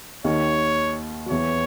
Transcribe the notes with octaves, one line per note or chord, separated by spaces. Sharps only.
D#2 D#3 C#5
F#3
E2 E3 C#5